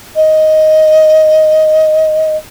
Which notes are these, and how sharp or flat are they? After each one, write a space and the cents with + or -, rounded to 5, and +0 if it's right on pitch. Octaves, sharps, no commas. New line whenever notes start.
D#5 +5